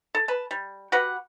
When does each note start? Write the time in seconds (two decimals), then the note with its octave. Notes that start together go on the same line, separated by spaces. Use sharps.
0.15 A4
0.28 B4 A5
0.51 G3
0.92 F#4 G4 B4 F#5